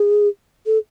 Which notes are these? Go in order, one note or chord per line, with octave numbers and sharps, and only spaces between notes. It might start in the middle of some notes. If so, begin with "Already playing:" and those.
Already playing: G#4
A4